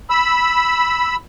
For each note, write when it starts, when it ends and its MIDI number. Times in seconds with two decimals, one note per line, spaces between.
0.10 1.16 83
0.10 1.16 88